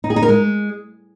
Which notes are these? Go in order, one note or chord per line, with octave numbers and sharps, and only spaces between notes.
D#4
G#4
D#4
A#4
G#3